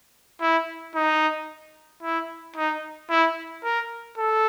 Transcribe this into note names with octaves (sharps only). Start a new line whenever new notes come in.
E4
D#4
E4
D#4
E4
A#4
A4